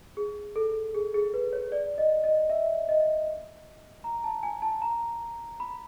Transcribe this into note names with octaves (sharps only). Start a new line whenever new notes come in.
G#4
A4
G#4
G#4
B4
C#5
D5
D#5
D#5
E5
D#5
A#5
A5
G#5
A5
A#5
B5